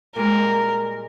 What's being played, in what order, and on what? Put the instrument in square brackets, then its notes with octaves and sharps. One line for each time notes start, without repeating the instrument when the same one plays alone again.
[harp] A#2 G3 G#3 [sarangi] A#4